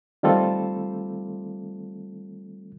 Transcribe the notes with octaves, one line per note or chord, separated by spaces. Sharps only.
D#3 G3 A3 C4 F4 A4